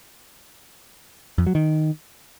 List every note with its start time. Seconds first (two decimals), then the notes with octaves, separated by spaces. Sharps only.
1.38 F2
1.47 F#3
1.55 D#3